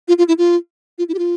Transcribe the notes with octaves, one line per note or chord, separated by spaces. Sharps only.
F4
F4
E4
F4
F4
E4
G4
F4